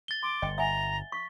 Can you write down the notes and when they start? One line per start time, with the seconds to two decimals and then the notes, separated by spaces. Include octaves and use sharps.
0.08 A6 G7
0.23 C6 D6
0.42 G1 D#5 G5
0.58 E5 F#5 G#5 A#5
1.12 C#6 B6